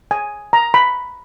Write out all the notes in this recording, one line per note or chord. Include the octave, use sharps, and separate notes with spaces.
G#5
A#5
B5